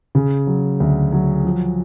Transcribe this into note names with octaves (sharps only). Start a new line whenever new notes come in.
C#3
F#3
D2
F#3
F3